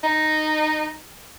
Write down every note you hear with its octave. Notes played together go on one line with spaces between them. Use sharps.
D#4